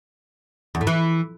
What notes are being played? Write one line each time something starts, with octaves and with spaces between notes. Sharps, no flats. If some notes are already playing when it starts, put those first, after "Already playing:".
E2
A2
E3